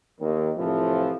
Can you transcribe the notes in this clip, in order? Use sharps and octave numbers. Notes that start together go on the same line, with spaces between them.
D#2 D#3
A2 C3 E3 F3